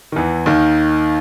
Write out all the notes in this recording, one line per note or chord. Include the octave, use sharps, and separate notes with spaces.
D#3
E2 E3
D#2 D#3